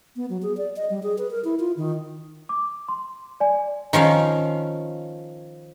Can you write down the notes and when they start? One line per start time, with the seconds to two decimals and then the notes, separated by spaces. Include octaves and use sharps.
0.16 B3
0.30 F#3
0.43 G#4
0.57 D5
0.76 D#5
0.90 G3
1.03 G#4
1.18 B4
1.31 A#4
1.44 E4
1.59 F4
1.77 D#3
2.49 D6
2.88 C6
3.40 D5 G#5
3.93 D#3 F3 C#4 F5